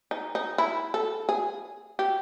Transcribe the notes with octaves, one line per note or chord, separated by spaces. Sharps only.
D#4
D#4
E4
A4
G#4
G4